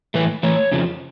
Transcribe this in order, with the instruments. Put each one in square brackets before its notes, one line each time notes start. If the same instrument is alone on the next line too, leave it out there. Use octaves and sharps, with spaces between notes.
[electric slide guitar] A2 E3 A3 B4
A2 E3 A3 C#5
F2 C#3 F3